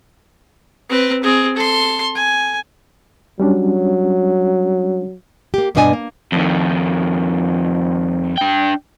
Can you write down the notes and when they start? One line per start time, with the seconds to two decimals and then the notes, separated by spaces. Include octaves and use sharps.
0.89 C4 B4
1.23 C4 G#4
1.56 A4 C6
2.15 G#5
3.40 F#3 G3 C#4 D4
5.54 A#3 G4
5.75 G2 B2 B3 D4 D#5 G#5
5.93 A#3
6.32 F2 D#3
8.38 D4 G5